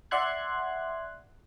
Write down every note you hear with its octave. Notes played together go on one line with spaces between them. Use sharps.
D5 E5 F#5 C6 F#6 G#6